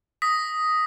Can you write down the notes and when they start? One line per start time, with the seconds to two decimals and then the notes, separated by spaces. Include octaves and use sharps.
0.22 D#6 A#6 B6